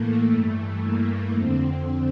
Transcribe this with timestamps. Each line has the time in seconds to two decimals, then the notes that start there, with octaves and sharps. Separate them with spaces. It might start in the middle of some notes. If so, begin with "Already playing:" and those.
Already playing: A2 E3 A3 A#3
0.31 G2 E3 A3
0.83 A#3
1.36 F2 D3 C4